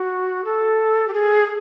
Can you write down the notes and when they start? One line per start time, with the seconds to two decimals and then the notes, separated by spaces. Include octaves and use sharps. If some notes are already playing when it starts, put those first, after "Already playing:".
Already playing: F#4
0.44 A4
1.07 G4
1.13 G#4